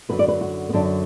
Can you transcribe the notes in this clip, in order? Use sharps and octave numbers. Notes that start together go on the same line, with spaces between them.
F#2 D3 F#3 B4
D5
B4
F#4
B3
F#2 D3 F#3 D4